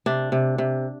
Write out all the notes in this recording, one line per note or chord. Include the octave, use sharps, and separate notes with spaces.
C3 D4
C3
C3